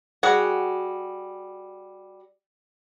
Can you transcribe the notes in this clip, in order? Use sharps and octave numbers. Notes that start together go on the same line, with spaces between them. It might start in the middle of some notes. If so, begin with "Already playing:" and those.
G3 F#4 G#4 F#5